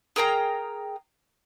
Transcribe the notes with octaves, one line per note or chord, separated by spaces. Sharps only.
G#4 A#4 G5 A#5